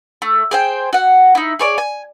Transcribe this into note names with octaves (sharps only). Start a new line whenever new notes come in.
A3
G#4 C5 G5
F#4 F#5
D#4 E4
G#4 C#5 D5
G#5